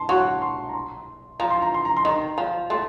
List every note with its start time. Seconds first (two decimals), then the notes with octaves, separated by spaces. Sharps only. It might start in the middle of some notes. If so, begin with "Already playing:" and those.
Already playing: A5 C6
0.09 F#3 C#6
0.42 C6
0.69 A#5
0.74 C6
1.40 F3 A#5
1.50 C6
1.62 A#5
1.74 C6
1.85 A#5
1.97 C6
2.05 D#3 A#5
2.38 F3
2.70 A3 C6